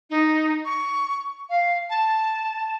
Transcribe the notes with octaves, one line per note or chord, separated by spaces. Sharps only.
D#4
C#6
F5
A5